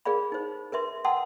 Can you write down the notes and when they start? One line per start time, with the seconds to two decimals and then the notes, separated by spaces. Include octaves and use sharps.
0.05 G#4 A#4 D5 F5 B5
0.32 D#4 C5
0.72 A#4 B4 E5 C6
1.04 F#5 G5 A5 C6 D#6 E6